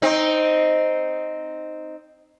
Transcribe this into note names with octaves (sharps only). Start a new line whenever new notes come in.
C4 D#4